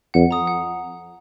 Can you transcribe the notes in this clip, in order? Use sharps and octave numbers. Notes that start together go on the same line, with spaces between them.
F2 F#5
A#5 D#6
F#5